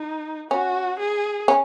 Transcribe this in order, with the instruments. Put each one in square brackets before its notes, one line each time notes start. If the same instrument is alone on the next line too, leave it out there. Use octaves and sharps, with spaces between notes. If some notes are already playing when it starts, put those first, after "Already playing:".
Already playing: [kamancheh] D#4
[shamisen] C#4 [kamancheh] F#4
[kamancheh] G#4
[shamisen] C#4